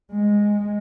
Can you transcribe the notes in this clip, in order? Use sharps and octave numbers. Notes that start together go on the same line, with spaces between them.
G#3